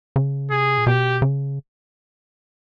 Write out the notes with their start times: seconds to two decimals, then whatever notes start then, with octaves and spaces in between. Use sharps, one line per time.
0.16 C#3
0.51 C3 G#4
0.78 A#2
0.86 B2 G4
1.22 C#3